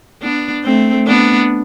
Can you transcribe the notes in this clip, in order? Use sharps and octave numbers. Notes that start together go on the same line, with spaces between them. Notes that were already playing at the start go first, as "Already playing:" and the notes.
B3 D4
A3 C4
B3 D4